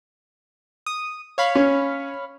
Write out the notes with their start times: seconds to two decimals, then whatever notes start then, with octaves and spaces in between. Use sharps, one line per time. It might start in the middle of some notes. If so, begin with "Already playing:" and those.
0.86 D#6
1.38 C#5 F5 B5
1.55 C#4